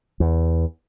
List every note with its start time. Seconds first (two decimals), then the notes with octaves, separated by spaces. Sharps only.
0.20 E2